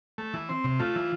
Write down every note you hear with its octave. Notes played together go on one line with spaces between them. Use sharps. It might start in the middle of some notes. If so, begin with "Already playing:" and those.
A3
E3
C4
C3
A3 F4
E3